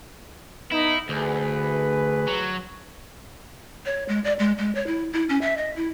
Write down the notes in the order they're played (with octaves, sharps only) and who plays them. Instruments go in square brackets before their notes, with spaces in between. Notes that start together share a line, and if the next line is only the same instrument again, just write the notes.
[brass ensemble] B3 D#4 [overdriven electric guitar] E4
[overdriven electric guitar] D2 [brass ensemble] G#4 B4
[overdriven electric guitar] F#3
[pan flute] C#5
G#3
D5
G#3
G#3
C#5
E4
E4
C#4
E5
D#5
E4